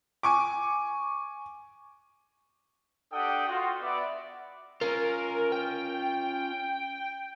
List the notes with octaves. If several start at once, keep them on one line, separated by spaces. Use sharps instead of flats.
G#5 C#6 D6
D4 G4 A4 F#5 G5 D#6
F4 F#4
B3 D5 E5
C#4 F4 A#4
G5